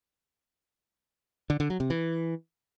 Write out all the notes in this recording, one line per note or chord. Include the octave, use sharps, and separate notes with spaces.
D3
D3
F#3
C3
E3